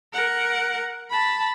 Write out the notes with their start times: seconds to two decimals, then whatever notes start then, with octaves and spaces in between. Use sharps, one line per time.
0.13 A#4 F#5
1.10 A5 B5